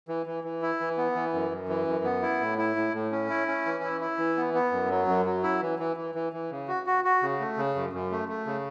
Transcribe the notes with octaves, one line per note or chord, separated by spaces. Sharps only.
E3
E3
E3
E4
E3
B3
E3
F#2
F#2
E3
F#2
B3
E4
A2
E4
A2
A2
C#4
E4
C#4
E3
E4
E4
E3
B3
B3
F#2
F#3
F#2
F#3
E4
E3
E3
E3
E3
E3
C#3
F#4
F#4
F#4
C#3
A3
C#3
F#2
F#2
A3
A3
C#3